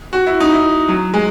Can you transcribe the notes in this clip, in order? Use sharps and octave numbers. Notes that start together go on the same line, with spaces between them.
F#4
E4
D#4
E4
F#3
G#3